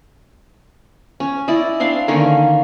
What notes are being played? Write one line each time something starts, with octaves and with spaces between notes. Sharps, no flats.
C#4
E4 D5 D#5
C4 D4 F5 C6
D3 D#3 A#3 C#4